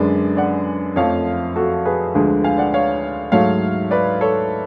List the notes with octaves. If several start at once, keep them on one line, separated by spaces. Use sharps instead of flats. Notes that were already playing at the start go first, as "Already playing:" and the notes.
Already playing: F#2 D3 G#3 B4 D5
D5 F#5
F2 F3 A3 C#5 F5
F#4 A4
G#4 B4
D2 D3 F3 G#3
F5 G#5
D5 F#5
C#5 F5
G#2 F#3 A3 C#5 F5
B4 D5
A4 C#5